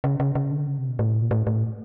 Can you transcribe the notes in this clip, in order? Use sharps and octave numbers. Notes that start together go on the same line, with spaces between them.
C#3
C#3
C#3
D3
C#3
C3
B2
A2
A#2
A2
A2